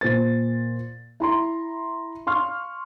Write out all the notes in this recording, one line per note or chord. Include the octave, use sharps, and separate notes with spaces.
A#2 C5 A6
E4 A#5 C6
F5 C6 C#6 F6